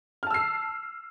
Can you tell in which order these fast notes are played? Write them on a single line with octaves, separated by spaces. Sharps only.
F6 A5 E6 C7